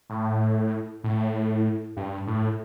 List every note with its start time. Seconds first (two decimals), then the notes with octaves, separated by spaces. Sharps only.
0.10 A2
1.04 A2
1.97 G2
2.27 A2